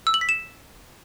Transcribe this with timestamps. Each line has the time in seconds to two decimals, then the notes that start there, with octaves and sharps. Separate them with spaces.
0.07 E6
0.14 F#7
0.21 B6
0.29 E7